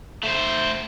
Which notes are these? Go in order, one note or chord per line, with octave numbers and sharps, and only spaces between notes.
A3 C5